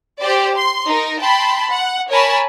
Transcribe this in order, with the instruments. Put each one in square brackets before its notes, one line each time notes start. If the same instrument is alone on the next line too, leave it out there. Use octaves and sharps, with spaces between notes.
[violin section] G4 C5 D5
C6
D#4 A#4
G5 A5 B5 C6
F#5
A#4 C#5 G#5 A5 B5